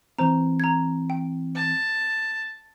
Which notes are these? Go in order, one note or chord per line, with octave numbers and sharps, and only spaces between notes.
E3 C4 C5 A#5
A#5 G#6
G5
A5